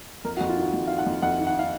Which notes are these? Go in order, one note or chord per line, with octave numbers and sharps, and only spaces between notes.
F2 A#4
F#4
F2
F4
D#3 F#4
F2
D#3 F5
F#5
F2
F2 F#5
D#3
F#5
D#3 F5